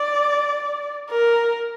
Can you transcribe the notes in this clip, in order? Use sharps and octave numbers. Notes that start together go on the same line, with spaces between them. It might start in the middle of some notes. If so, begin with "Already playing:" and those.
Already playing: D5
A#4